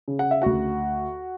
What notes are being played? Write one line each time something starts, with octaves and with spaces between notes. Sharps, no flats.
C#3
F#5
E5
D2 F#4 F#5